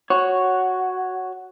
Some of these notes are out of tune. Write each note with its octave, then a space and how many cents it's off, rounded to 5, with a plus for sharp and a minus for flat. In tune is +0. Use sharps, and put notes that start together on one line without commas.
F#4 +0 C#5 +0